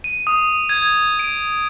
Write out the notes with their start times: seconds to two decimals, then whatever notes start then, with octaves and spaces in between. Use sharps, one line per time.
0.04 D#7
0.27 D#6
0.69 G#6
1.19 D7